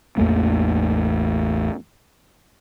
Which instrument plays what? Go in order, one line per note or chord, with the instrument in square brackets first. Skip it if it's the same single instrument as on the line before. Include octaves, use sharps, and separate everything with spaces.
[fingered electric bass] A1 E2 A3 A#3